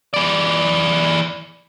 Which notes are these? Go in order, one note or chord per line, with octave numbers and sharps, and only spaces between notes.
E3 D5